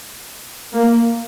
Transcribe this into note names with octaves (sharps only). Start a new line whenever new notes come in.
A#3